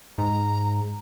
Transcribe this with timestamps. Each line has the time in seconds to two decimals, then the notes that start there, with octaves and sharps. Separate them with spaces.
0.18 G#2 A#5